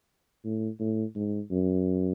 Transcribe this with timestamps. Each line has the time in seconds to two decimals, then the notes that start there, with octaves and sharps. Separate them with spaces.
0.44 A2
0.80 A2
1.15 G#2
1.51 F#2